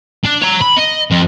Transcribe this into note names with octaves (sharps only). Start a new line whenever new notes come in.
D4
C#5 A#5
B5
D#5
F2